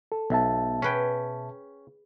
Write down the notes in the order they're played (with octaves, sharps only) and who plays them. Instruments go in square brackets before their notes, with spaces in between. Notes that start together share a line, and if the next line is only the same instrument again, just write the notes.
[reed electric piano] A4
[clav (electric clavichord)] B1 [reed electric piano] B2 E5 A5
[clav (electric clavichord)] C#4 G5 [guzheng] G#4 B4